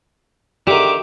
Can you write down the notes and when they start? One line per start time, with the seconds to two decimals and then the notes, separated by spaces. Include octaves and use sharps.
0.67 D3 D#3 G4 E5 D6